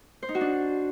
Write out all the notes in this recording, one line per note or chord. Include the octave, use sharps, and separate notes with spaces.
C5
D#4
F#4
D4